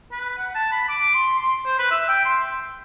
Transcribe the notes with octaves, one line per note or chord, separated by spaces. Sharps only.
B4
F#5
A5
B5
D6
C6
C6
C5
B4
E5
G5
C6